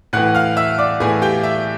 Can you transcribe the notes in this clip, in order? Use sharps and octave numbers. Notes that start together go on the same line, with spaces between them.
A2 E3 F#5 F#6
F5 F6
E5 E6
D5 D6
A2 E3 G#4 G#5
G4 G5
E5